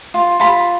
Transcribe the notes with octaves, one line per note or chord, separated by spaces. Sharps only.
F4
F4 B5